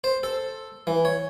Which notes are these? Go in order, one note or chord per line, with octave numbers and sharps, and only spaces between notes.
C5
A4
E3
C#5